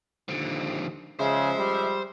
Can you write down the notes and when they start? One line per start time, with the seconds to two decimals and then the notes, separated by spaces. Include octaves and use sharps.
0.29 D#2 D3 F3
1.19 C#3 F3 G#3 C5 E5
1.59 G3